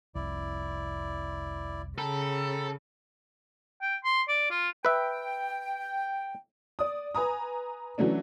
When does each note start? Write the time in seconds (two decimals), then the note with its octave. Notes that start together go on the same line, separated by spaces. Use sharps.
0.15 F1 C2 E4 D5
1.98 C#3 A4 G5 A#5 B5
3.82 G5
4.04 C6
4.28 D5
4.50 F4
4.85 B4 E5 G5
6.79 D5 D#6
7.15 B4 G#5 A#5 D#6
7.98 E3 F#3 A3 C#4 D4